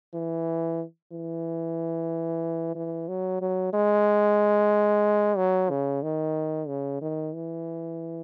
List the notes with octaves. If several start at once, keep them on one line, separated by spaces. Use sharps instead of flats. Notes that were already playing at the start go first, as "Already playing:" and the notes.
E3
E3
E3
F#3
F#3
G#3
F#3
C#3
D#3
C#3
D#3
E3